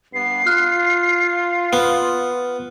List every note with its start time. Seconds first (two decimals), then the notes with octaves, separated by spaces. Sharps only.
0.14 G2 B3 C7
0.47 F4 F6 F#6
1.73 B3